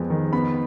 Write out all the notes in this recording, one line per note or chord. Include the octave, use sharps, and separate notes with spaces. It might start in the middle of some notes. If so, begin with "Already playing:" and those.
Already playing: F2 G#3 B3
D#3
B3 B5